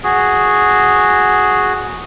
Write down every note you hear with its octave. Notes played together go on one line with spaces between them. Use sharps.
F#4 G#4